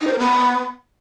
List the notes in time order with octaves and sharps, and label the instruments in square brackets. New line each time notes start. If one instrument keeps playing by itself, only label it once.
[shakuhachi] D#4
C5
A#4
B3